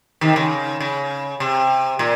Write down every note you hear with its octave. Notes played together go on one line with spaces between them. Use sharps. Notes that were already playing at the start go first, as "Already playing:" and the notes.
C3 D#3
C#3
C#3
C3
A#2